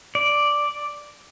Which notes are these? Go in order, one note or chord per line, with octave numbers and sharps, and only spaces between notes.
D5